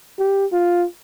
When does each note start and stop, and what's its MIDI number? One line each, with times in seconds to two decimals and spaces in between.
0.19 0.46 67
0.52 0.85 65